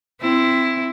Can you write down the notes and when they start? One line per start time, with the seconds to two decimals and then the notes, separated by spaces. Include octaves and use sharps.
0.21 C4 E4